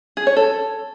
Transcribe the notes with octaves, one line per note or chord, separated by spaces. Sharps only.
G#4
C#5
A4